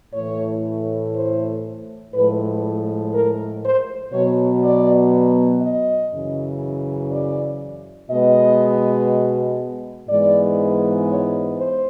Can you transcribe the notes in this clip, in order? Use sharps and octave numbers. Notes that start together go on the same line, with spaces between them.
A2 E3 A3 C#5
C5
A2 F3 G#3 B4
A#4
C5
B2 F#3 B3 C#5
D5
D#5
F#2 C#3 E3
D5
B2 G#3 B3 D#5
G#2 E3 G#3 B3 D5
C#5
C5